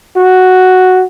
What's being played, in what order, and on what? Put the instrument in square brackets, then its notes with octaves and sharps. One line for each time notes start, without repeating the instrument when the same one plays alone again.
[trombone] F#4